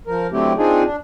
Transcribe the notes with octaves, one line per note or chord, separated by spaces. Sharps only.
F3 A#4
D3 F#3 A3 C4 E4 G4
C4 D4 D#4 F4 G#4
D4